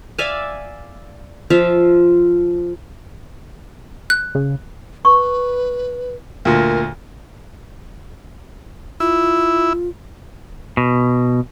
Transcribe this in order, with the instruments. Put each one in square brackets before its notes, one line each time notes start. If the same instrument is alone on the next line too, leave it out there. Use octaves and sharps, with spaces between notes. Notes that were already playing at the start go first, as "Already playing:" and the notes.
[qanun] D5 E5 F5 G#5
F3 F4 E5 F5
[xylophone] F#6
[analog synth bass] C#3
[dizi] B4 [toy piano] C#6
[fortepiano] D2 A#2 [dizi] A#4
[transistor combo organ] E4 [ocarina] F4
[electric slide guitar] B2